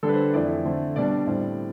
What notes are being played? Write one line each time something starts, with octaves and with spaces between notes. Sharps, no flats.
D3 G3 D4 A4
B4
C5
F2 E3 A3 D5
D3 A3 C4
B2 G3 D4 D5
A2 G3 C4